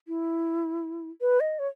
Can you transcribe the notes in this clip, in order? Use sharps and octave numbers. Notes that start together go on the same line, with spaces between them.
E4
B4
D#5
C#5